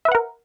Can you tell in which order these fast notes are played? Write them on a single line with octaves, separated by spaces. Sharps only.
E5 B4 F#5 A#4